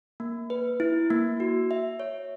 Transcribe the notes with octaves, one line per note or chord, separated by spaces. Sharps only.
A#3
B4
E4
A#3
F#4
E5
C#5